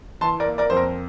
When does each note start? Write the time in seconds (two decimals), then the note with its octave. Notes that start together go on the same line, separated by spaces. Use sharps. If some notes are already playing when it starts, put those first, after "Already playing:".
0.21 E3 A5 C6
0.40 A#4 D5
0.46 A#3
0.58 A#4 D5
0.70 F2 C5
0.77 A#4